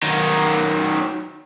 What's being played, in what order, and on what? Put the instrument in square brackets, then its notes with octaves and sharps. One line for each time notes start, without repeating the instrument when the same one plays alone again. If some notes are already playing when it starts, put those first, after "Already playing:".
[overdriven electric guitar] D#3 F#3